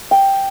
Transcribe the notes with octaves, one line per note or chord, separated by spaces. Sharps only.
G5